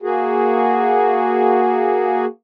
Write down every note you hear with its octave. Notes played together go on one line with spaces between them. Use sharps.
A#3 F#4 G#4